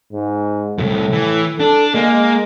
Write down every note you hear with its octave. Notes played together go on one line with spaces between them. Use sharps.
G#2
C2 F#2 A2
E3
D4 A4
G#3 A#3